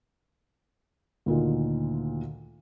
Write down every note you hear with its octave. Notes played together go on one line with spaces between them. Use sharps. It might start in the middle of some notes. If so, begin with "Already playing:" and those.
D2 A#2 D#3